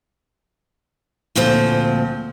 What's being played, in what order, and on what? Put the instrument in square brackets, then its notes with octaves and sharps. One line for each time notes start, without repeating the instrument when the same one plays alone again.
[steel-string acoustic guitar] D2 A#2 F3 C4